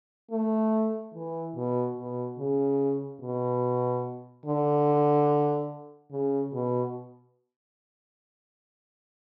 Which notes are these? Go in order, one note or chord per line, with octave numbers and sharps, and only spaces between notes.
A3
E3
B2
B2
C#3
B2
D3
C#3
B2